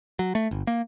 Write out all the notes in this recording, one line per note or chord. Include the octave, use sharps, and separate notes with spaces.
F#3
A3
G1
A#3